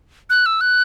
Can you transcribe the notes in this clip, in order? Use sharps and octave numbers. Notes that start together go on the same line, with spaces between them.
F#6
E6
F#6